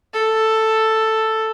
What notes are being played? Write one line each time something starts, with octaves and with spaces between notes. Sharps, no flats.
A4